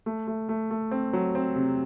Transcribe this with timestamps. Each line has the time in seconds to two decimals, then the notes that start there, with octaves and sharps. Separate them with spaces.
0.06 A3
0.27 A3
0.49 A3
0.71 A3
0.91 C4
1.13 F#3
1.35 C4
1.56 C3